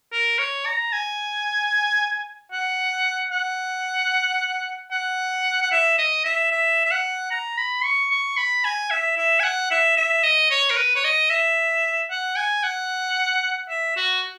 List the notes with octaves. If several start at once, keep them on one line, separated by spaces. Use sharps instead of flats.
A#4
C#5
A#5
G#5
F#5
F#5
F#5
F#5
E5
D#5
E5
E5
E5
F#5
A#5
B5
C#6
C#6
B5
G#5
E5
E5
G#5
F#5
E5
E5
D#5
C#5
A#4
B4
C#5
D#5
E5
F#5
G#5
F#5
E5
F#4